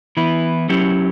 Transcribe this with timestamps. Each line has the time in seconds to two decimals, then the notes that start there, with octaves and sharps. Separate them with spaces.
0.17 E3 B3 E4
0.69 F#3 C#4 E4 G4